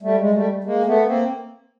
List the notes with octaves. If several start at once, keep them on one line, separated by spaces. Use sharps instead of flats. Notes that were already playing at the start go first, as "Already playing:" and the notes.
G3 A3
G#3
G3 A3
G#3 A#3
A3 B3
A#3 C4